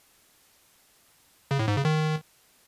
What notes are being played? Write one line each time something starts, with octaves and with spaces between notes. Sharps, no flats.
C#3
A2
G#2
C#3
D#3